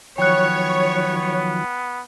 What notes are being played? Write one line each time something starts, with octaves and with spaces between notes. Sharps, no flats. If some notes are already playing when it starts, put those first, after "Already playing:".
D#3 F3 F#3 B3 C#5 G5 F#6